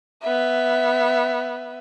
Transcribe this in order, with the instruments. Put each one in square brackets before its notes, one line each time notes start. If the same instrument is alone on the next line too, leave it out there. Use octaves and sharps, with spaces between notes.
[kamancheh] B3 E5